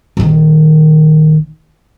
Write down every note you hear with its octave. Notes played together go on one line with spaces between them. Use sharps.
A#1 D#3